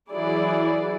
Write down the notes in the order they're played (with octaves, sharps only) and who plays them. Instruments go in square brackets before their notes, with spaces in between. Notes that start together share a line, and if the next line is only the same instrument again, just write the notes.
[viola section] E3 F#3 E4 G#4 D5